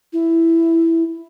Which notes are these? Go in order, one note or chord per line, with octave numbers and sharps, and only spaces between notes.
E4